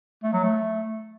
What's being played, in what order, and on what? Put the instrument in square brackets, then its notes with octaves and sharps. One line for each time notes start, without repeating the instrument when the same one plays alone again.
[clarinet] A3
F#3
A3